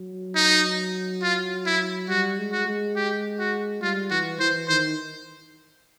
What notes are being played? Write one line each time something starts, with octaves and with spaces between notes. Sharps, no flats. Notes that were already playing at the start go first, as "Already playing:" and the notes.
Already playing: F#3
D#4
F4
E4
G3 F#4
G#3
F#4
G#3
G4
F#4
G3 F4
E3 F#4
E3 C5
D#3 C5